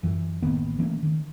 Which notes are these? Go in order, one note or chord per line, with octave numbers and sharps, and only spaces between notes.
F#2 E3
A1 D#3 A#3 B3
E3 A3 A#3 C#4
D#3